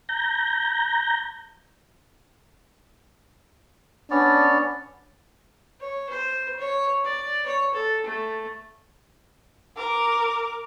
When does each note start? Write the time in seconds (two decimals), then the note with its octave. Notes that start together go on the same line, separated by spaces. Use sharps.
0.09 A#5 G6
4.11 B3 C#4 D4 D5
5.81 C#5
6.09 C5
6.59 C#5
7.05 D5
7.46 C#5
7.74 A4
8.06 A3
9.76 A#4 D6